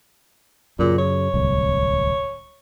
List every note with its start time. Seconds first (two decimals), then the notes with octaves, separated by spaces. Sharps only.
0.79 F#2 A#2 C#3
0.99 C#5
1.34 D1 C2